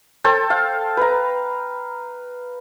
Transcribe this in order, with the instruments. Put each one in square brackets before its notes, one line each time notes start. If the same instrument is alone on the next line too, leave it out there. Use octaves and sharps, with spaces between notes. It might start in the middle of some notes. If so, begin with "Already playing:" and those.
[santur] A4 C5 G5 A5
F5
B4 A#5